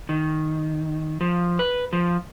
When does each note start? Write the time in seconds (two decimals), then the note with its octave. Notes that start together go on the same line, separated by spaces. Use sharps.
0.09 D#3
1.21 F3
1.59 B4
1.93 F3